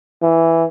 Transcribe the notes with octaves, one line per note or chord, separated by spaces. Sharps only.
E3